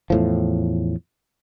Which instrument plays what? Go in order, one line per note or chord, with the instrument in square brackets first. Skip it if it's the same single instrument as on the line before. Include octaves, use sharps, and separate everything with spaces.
[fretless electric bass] E2 A2 F3